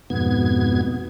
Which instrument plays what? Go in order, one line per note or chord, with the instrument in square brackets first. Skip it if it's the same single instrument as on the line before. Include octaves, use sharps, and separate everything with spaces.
[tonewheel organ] F2 G#2 B2 B3 G#6